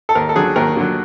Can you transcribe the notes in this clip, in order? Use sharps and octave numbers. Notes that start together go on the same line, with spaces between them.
A4
D#2 A#4
A4
D3 F#3 G#4
D#2 A#4
D3 F#3